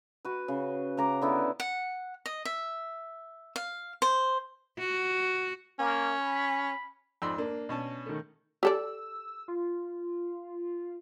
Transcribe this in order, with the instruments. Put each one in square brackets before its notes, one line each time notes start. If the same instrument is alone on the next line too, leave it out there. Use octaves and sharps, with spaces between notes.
[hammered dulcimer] F#4 B4
C#3
C#3 A#5 D6
D3 B3 E4
[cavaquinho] F#5
D#5
E5
F5
C5
[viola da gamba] F#4
[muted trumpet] A#3 [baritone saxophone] C#4
[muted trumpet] B5
[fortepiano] F2 G#2 B5 [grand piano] D5 C6 E6
[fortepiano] A#3 [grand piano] D4
[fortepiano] B2 C#4 A5
[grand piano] D#3 A3
[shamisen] G4 A4 D5 [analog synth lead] E6
[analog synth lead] F4